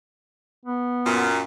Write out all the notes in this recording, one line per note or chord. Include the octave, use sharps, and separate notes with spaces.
B3
F#2 A#2